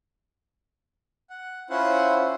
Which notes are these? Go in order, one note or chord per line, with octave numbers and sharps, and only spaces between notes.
F#5
C#4 E4 F4 C5 F#5